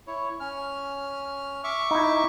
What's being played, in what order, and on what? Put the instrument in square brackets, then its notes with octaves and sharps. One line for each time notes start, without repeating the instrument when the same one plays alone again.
[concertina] E4 C#5
C#4 F6
E5 C#6 D6
[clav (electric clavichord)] D#4 E4